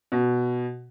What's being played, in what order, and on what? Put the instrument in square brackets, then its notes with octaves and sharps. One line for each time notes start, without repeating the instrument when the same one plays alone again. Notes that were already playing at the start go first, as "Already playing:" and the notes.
[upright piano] B2